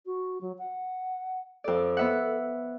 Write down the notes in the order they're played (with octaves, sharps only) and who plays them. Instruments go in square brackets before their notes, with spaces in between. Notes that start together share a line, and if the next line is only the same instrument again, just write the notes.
[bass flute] F#4
F#3
F#5
[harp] F2 D5 [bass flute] A4
[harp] B3 E5 F#5